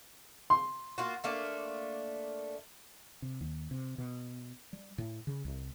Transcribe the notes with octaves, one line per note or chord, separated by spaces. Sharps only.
C6
A#3 F4 F#4
A3 A#3 D4
C3
D#2
C3
B2
G3
A2
C#3
C2